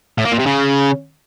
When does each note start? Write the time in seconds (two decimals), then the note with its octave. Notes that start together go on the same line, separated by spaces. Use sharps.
0.18 A2
0.25 A#3
0.32 A#2
0.39 C3
0.46 C#3